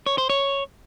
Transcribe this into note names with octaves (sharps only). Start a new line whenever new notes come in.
C#5
C5
C#5